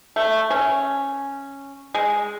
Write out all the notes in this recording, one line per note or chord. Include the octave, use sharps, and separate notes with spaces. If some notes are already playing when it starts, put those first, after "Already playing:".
A3
C#4
G#3